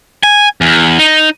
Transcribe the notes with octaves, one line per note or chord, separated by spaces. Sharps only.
G#5
E2
D#4